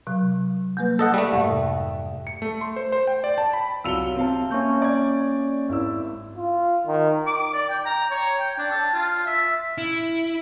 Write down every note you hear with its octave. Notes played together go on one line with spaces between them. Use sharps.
C3 F#3
G3 A#3 B4
A4 D#5 F#5
G3 A3
F2 G#2 C3
C#7
A3
C6
C5
C5
G5
D5
A5
B5
C2 F#3 F4 E6 C#7 F7 G7
C3 C4 F5 A5
A#3 C#4 E5 C#6 G6
D5 G#6
G#1 E4 E6
F4
D#3
D6
D5
G5
A#5
C#5
G5
D4
A5
F4
E5
E4